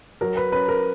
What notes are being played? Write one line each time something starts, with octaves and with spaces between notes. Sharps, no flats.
F#3 A#4
B4
C#4 B4
A#4